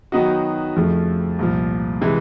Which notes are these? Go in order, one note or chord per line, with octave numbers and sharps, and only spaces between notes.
D#3 F#3 B3 D#4 F#4
F2 C#3 F3 A3
C2 A#2 F3
C3 E3 G#3